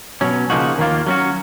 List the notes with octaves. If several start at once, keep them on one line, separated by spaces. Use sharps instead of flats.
B2 F#3 C#4
C#3 F3 A#3 D#4 F#4
D#2 D#3 A#3 F4
F#3 C#4 F#4